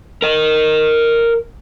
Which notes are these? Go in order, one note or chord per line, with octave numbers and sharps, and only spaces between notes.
A#4 D#5